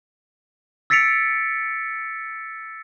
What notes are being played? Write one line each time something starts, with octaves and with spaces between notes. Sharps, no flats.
E6 A6 B6 C#7 D7 F7